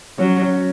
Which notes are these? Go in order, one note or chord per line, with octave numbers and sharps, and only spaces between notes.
F#3 C#4
C#4